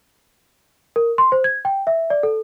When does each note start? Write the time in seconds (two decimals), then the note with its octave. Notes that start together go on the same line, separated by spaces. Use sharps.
0.96 A#4
1.18 C6
1.32 C5
1.44 G#6
1.65 G5
1.87 E5
2.10 D5
2.23 A4